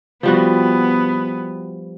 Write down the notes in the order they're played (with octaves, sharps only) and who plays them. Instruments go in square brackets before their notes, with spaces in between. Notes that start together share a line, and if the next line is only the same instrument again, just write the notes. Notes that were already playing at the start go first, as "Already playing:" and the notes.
[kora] F3 G3 F#4 [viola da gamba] B3